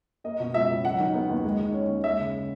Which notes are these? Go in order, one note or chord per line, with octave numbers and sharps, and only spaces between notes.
A#3 D#5
B2
C#2 E5
C#2
F#3 F#5
D#3
B3
D#2
G#3
D#3
C#4
D#2
G#3 E5
C#3